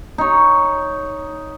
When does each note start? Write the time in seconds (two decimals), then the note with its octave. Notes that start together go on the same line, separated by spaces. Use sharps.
0.18 D#4 C#5